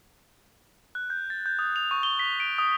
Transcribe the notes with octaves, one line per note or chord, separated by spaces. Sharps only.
F#6
G6
A6
G6
D#6
F7
C#6
G7
B6
D7
D#6